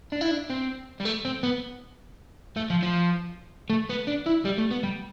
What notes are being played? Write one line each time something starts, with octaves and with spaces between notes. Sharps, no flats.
D4
E4
D4
C4
G3
A3
C4
B3
A3
F3
F3
A3
B3
D4
E4
G3
A3
B3
G3